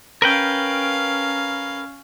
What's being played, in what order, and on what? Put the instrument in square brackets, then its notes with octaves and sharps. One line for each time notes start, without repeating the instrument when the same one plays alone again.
[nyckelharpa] C#4 F5 [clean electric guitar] A#4 B4 G5